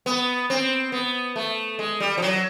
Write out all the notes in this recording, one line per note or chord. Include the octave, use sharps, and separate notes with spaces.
B3
C4
B3
A3
G#3
G3
F3
F#3